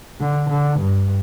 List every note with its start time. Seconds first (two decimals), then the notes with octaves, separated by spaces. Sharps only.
0.21 D3
0.50 D3
0.80 G2